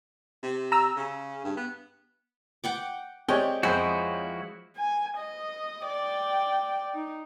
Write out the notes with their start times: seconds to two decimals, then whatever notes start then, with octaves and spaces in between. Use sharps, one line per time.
0.43 C3
0.72 A#5 E6
0.97 C#3
1.44 G2
1.57 B3
2.64 F#5 G5 D6
3.29 G#3 C4 G4 C#5 D5 G5
3.63 F2 F3 G#3 E4 F#4 C5
4.77 G#5
5.17 D#5
5.86 D5 G5
6.94 D#4